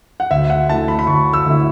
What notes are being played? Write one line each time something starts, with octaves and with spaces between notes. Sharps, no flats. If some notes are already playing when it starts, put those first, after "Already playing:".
F#5
D2 E5
F#5
D3 A3 E4 A5
B5
B5
D2 C#6
E6
D3 A3 E4